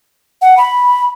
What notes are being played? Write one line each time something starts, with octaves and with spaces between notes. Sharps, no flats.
F#5
B5